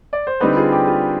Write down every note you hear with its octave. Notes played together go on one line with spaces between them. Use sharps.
D5
C5
D3 G3 C4 D#4 G4 B4
F4 G#4
G4
F4